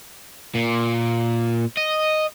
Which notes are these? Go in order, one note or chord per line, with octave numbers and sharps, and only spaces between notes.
A#2
D#5